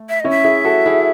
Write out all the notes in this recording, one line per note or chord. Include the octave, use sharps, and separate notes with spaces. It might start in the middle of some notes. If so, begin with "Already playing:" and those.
Already playing: A3
E5
C#4 E4 D#5
E5
E4 G#4
F#4 A4
E4 G#4